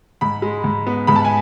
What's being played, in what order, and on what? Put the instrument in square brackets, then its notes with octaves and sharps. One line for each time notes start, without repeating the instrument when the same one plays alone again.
[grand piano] G#2 B5
G#3
G#2
B3
G#2 B5
A5
G#5